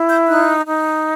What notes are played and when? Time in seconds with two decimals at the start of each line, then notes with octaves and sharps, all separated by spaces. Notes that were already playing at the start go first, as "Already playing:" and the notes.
Already playing: E4
0.08 G6
0.27 D#4 F#6
0.66 D#4